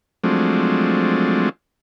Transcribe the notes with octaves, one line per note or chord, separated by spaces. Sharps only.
F3 F#3 G#3 A3 C4 D4